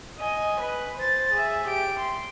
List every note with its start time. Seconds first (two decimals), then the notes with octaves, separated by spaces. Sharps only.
0.18 D#5 G#5
0.60 B4
0.97 C5 A6
1.33 G#4 E5
1.67 G4 D7
1.99 C6